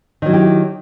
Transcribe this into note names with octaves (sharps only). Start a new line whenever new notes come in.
D#3 F#3 E4 G4